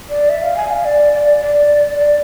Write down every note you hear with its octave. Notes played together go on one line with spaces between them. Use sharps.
D5
E5
F5
G#5
F5
D5
D5
D5
D5